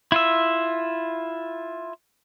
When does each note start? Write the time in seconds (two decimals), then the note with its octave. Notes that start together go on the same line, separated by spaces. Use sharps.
0.12 E4 F4 E5